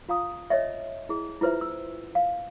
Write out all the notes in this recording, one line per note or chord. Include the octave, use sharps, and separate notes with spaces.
F4 F5 A#5 D#6
C#5 D#5 E5
E4 G#4
E4 F4 B4 C5 E5
E6
F5